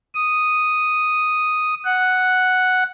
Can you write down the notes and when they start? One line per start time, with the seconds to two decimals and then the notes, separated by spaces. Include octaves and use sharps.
0.15 D#6
1.84 F#5